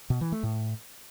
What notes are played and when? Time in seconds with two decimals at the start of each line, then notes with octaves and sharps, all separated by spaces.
0.10 B2
0.21 E3
0.32 A3
0.43 A2